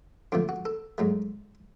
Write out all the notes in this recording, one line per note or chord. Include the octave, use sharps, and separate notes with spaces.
F2 D3 F3 A3 D4
F#4
A4
G#2 F#3 A3